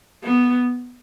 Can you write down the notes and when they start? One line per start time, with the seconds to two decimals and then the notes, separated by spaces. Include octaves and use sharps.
0.24 B3